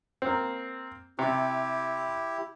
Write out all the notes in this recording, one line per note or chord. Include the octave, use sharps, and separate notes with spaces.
A#3 C4
C3 E4 G4